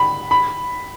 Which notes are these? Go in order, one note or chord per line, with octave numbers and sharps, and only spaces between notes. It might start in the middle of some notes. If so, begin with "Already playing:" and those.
Already playing: B5
B5